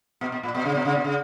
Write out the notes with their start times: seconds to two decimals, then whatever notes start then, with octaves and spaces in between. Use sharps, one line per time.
0.21 B2
0.32 B2
0.43 A#2
0.55 B2
0.65 C#3
0.75 B2
0.85 C#3
0.95 B2
1.04 C#3